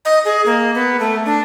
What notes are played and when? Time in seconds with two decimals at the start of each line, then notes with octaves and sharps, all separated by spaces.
0.05 D#5
0.25 G#4
0.46 A#3
0.74 B3
1.00 A3
1.25 D4